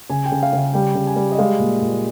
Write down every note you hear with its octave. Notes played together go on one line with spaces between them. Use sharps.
C#3 G#5
G5
C#3
F5
C#3
F5
G3 G5
C#3
G#5
G3
D#5
G#3 F5
A#2
A#2